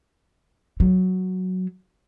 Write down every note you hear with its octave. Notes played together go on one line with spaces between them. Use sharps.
F#3